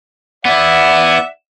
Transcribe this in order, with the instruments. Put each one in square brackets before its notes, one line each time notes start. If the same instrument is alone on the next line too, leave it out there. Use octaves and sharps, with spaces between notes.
[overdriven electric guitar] B3 E4 [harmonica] D5 E5 F#5